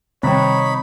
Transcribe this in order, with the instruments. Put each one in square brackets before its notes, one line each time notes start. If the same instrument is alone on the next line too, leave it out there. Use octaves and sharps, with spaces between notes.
[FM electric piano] C3 C4 [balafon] D#3 G3 G5 [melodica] D#4 B5 [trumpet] C#5